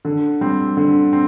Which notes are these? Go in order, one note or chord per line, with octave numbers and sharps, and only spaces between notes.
D3
G3 C4
D3
C4